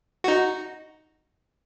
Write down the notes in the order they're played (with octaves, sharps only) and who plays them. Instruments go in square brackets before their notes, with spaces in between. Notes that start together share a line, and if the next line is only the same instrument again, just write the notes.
[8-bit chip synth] D#4 F#4